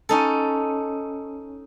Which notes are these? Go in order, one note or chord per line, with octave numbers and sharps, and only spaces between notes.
C#4 D#4 A4